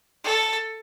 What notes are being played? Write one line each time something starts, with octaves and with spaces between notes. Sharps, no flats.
A4